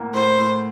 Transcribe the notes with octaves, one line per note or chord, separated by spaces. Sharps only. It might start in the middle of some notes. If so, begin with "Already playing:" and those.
Already playing: D2 A2 A#3
A2 C5
A2